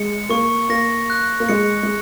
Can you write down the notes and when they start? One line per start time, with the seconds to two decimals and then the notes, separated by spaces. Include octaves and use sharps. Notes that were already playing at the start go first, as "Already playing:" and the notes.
Already playing: G#3 C#7
0.30 A#3 C#6
0.70 A#3 A#6
1.10 F#6
1.40 A#3
1.49 G#3 C#7
1.83 G#3